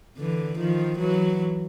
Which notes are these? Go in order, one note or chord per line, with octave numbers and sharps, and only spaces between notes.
D3 E3
D#3 F3
E3 F#3